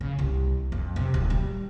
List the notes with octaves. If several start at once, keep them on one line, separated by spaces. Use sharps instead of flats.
C#3
C2
F2
C3
D1
G3